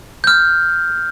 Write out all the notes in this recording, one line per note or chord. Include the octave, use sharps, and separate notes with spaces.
F6 G6